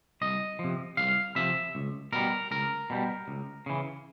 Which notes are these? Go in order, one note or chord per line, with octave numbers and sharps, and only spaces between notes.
C2 D#5
F3
C3
C2 F5
C3 F3 E5
C#2
B2 G3 A#4
C#2 A#4
B2 G3
C#2
C#3 E3